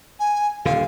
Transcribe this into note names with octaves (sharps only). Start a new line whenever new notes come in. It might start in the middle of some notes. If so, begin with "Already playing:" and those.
G#5
D#1 D3 F5